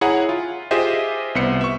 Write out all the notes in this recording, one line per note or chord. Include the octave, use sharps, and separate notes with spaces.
E4 G#4 C#5 F#5 A#5
F4
F4 G4 G#4 C5 D#5 E5
C2 B3 C5 C#7
E5 C#6